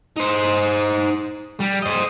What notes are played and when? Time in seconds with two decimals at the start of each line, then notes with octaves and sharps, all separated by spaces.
0.17 D#4 C5
1.60 G3
1.82 C5 D#5